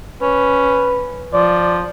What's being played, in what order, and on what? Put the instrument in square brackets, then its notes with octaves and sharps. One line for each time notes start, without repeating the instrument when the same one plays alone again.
[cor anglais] C#4 [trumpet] B4
[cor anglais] F3 [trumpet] D5